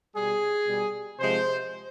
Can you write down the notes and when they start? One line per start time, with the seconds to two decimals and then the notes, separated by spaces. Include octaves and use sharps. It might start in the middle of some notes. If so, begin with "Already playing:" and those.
0.15 B2 G3 G#4
0.67 B2 G3
1.20 C3 F3 G#3 C5